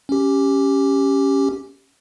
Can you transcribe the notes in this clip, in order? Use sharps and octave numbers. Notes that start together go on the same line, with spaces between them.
C#4 G4